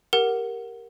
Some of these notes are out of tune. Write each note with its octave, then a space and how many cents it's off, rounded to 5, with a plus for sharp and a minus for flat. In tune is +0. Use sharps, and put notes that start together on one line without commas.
G4 +10 A#4 +0 F#5 +0